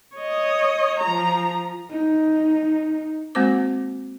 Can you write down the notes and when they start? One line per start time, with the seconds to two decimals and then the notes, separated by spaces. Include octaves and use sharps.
0.17 C#5 D#5
1.00 F3 A#5
1.91 D#4
3.35 G#3 A#3 C4 F#4 C5 D6